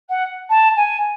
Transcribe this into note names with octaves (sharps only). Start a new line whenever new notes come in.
F#5
A5
G#5